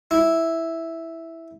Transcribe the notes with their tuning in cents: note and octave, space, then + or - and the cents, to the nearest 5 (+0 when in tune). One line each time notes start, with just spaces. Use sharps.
E4 -5